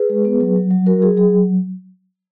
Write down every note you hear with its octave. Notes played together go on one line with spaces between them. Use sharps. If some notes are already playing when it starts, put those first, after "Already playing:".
Already playing: G#4 B4
G#3
B3
F#3
F#3
F#3
F#3 F#4 A#4
F#3 G#4
F#3 G#4